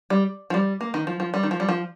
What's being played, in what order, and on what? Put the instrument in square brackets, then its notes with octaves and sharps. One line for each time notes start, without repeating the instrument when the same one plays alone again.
[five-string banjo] G3
F3
G3
A#3
D#3
F3
F3
G3
D#3
F3
G3
F3